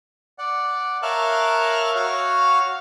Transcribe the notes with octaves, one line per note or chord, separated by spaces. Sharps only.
D5 F#5
A#4 C#5 E5 F5 A5 F#6
F#4 C#5 F5